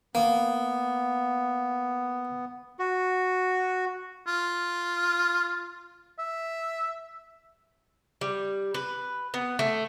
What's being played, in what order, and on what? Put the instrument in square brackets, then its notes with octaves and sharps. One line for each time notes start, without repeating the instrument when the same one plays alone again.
[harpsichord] A#3 [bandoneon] B3
[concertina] F#4
[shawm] F4
E5
[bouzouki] G3
B4
B3
A3